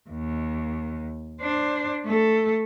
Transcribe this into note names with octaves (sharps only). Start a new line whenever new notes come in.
D#2
D4 C5
A3 A4